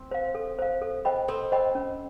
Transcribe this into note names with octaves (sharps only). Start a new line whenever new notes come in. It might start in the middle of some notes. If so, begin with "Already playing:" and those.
Already playing: C4
C5 F5
A4
C5 F5
A4
C5 D#5 G5 B5
C4 A4
C5 D#5 G5 B5
C#4